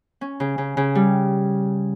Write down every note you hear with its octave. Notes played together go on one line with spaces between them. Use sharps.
C#4
C#3
C#3
C#3
G3